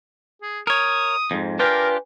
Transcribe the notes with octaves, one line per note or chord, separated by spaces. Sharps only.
G#4
A#4 C#5 D#6
F2 G#2
D4 F4 G4 A#4 B4 G#5